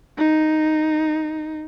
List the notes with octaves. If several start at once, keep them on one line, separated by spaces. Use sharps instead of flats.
D#4